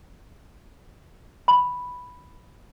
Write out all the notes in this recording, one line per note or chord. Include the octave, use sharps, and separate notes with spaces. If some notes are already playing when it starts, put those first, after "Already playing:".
B5